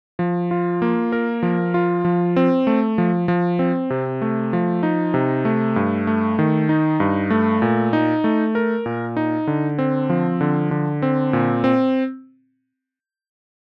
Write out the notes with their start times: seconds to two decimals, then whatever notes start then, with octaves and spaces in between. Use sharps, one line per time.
0.19 F3
0.51 F4
0.82 A#3
1.12 A#4
1.43 F3
1.74 F4
2.05 F3
2.36 C4
2.67 A3
2.98 F3
3.28 F3
3.59 C4
3.90 C3
4.22 A3
4.53 F3
4.83 D#4
5.14 C3
5.45 A3
5.76 G2
6.07 A3
6.39 D#3
6.69 D#4
7.00 G2
7.30 A3
7.62 A#2
7.93 D#4
8.24 A3
8.55 A#4
8.86 A#2
9.17 D#4
9.47 D3
9.79 C4
10.10 F3
10.41 D3
10.71 D3
11.02 C4
11.33 A#2
11.64 C4